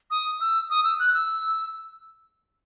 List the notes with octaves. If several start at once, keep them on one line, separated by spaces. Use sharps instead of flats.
D#6
E6
D#6
E6
F#6
E6